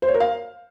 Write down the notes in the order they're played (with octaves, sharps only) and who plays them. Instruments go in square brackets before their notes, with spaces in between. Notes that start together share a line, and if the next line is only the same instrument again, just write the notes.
[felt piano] C5
C#5
A#4
F5